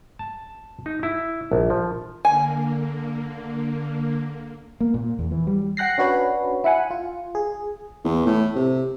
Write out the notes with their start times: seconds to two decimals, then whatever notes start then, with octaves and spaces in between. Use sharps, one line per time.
0.19 A5
0.86 D#4
1.03 E4
1.52 A#1
1.70 F3
2.25 D3 A#3 G#5
4.81 A#3
4.94 A#2
5.19 E2
5.31 E3
5.47 G3
5.77 F#5 G5 F#6 A#6 C7
5.98 C#4 D4 F#4 B4 C#5
6.64 E4 E5 F#5 G#5
6.91 F4
7.35 G#4
8.04 E2
8.26 A2
8.55 C3